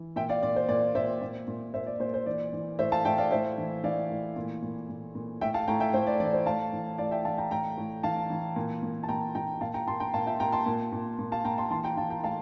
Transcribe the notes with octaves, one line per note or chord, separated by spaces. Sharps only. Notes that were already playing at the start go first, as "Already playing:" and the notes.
Already playing: E3
A#2 E5 G5
D5 F5
A#2 D5
C5
A#2 D5
A#2 C5 E5
A#2
A#2
A#2 C5 E5
D5
A#2 C5
C5
E3 D5
E3
A2 C5 E5
F5 A5
A2 E5 G5
D5 F5
A2 C5 E5
E3
E3 D5 F5
A2
A#2
A#2
A#2
A#2
A2 E5 G5
F5 A5
A2 G5 A#5
E5 G5
A2 C5
D5
E3 D5
C5
A2 F5 A5
E3
A2 D5 F5
E5 G5
E3 F5 A5
G5 A#5
A2 G5 A#5
A2
E3 F5 A5
E3
A#2
A#2
A5
A#2 G5 A#5
A#2 G5 A#5
A#2 F5 A5
G5 A#5
A#2 A5 C6
G5 A#5
A#2 F5 A5
E5 G5
A#2 G5 A#5
A5 C6
A#2
A#2
A#2
F5 A5
A#2 G5 A#5
A5 C6
E3 A5 C6
G5 A#5
E3 F5 A5
G5 A#5
A2 F5 A5